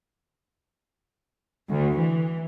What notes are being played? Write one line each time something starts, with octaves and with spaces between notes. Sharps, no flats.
D2
E3